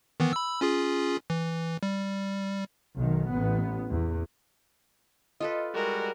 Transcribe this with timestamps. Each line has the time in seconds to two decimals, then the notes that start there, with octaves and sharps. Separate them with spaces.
0.20 D#3 E3 B3
0.33 B5 E6
0.61 C#4 F4 G#4
1.30 E3
1.83 G3
2.97 B1 D#3
3.31 A1 B3
3.89 E2
5.40 F4 A4 B4 D#5
5.75 G3 G#3 F#4 A#4